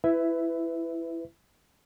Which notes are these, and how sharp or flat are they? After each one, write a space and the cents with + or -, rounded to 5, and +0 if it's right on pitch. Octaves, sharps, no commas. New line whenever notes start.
E4 +10 B4 +20 E5 +0